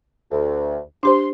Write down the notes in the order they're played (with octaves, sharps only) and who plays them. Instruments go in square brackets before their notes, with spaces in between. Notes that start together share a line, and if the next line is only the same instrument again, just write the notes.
[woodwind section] D2
[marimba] D4 G4 C5 [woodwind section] C6